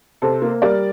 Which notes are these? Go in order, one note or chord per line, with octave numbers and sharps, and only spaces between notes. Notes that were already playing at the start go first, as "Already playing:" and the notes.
C3 A4 C5
A#3
G3 A#4 D5